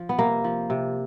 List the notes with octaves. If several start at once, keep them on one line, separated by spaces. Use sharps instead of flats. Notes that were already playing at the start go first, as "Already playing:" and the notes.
Already playing: F3
B3
C3 A#3
F3
C3